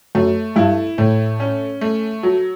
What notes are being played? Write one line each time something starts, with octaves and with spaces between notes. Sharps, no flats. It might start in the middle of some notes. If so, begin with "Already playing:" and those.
F#2 A3
G2 E4
A2 A3
C#4
A3
F#3